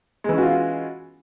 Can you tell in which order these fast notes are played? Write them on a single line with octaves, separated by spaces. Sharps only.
G#3 E3 C#4 F#4 F4